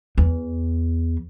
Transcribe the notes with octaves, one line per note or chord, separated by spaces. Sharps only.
E2